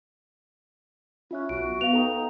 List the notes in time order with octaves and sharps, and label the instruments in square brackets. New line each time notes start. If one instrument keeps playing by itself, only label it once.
[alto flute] C#4 [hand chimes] F4 E5 F#6
[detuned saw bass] B1 [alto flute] F#4 [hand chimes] D7
[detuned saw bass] B3 [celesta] F5 F7
[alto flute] D#4 [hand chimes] A4 G5 A#5